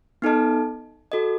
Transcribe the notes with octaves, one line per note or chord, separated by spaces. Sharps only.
B3 D#4 A4 D#5 A5
F#4 A4 D#5